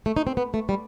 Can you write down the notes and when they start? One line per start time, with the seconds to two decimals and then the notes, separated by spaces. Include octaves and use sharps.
0.06 A3
0.17 D#4
0.27 C4
0.37 B3
0.54 A3
0.69 G3